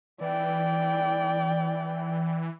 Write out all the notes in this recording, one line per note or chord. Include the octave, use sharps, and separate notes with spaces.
E3 D5 G5